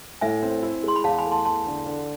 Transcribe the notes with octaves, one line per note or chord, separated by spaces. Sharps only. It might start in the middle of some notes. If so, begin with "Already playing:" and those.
A2 E5 G#5
C4
E4
G#3 C6
B5
E2 F5 A5
G#5 B5
A3
A5 C6
E2 A5 C6
D3
D3